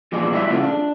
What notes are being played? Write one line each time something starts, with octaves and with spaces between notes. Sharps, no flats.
E2 A#2 F3 D5 D#5
G3 A3 E4 D#5 E5
A#2 C#3 F3 A3 D4 F4
D4